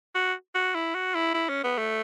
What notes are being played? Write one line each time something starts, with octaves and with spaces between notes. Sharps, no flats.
F#4
F#4
E4
F#4
E4
E4
C#4
B3
A3